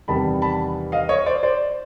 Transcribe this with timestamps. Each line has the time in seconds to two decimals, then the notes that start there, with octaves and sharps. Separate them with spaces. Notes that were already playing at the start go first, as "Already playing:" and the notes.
0.08 E2 C3 D#3 G3 A5 B5
0.42 A5 B5
0.92 D#5 F5
1.09 C#5 D#5
1.26 C5 D5
1.43 C5 D5